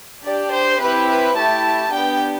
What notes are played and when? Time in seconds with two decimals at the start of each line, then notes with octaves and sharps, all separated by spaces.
0.25 D4 G4 D5
0.53 C5
0.81 C4 E4 G4 B4
1.09 B4
1.37 A3 E4 G4 A5
1.93 B3 D4 G4 G5